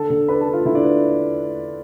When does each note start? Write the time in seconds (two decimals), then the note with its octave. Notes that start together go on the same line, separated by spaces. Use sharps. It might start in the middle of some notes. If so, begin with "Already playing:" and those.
Already playing: D3 A4 A5
0.10 D3
0.28 D4 B4 B5
0.41 A4 A5
0.47 D4
0.53 F4 F5
0.65 D3 E4 E5
0.75 D4 D5
0.84 A3 B4